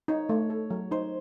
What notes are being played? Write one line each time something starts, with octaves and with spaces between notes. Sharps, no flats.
D#4 C#5
A3
A4
F#3
D#4 C5